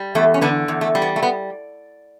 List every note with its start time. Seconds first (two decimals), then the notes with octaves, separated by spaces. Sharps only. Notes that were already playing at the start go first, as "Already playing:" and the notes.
Already playing: G3
0.15 E2 A3
0.34 C#4
0.41 D3 B3 D4
0.68 E2
0.81 A3
0.95 G3
1.02 B3
1.16 A3
1.23 B3